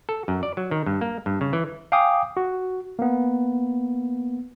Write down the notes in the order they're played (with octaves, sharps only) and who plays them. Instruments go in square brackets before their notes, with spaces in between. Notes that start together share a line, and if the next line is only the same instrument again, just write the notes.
[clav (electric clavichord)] A4
F#2
D5
F#3
D#3
G2
A#3
G2
C#3
E3
[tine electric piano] F5 G5 G#5 D6 D#6
F#4
A#3 B3